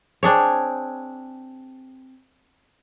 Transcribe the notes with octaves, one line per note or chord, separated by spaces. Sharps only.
C4 D4 G#4 C#5